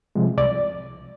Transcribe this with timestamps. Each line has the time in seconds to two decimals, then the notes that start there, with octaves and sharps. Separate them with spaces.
0.15 C3 F3 G#3
0.37 C2 D5